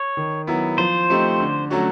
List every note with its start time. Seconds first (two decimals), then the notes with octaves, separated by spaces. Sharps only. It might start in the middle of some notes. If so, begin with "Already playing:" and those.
Already playing: C#5
0.17 D#3
0.47 F#3 B3 E4
0.78 F3 C5
1.10 A3 C4 D#4 G4
1.40 D3
1.70 F#3 A3 C#4 F#4